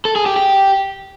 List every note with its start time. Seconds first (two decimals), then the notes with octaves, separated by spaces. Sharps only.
0.05 A4
0.16 G#4
0.26 G4
0.36 G4